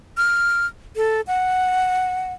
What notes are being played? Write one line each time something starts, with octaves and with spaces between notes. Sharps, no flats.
F6
A4
F#5